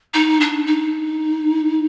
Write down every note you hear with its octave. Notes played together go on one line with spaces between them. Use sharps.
D#4
D4
D#4